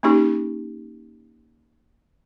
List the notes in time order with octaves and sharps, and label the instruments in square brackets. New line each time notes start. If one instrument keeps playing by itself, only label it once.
[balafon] A#3 C#4 D#4 G4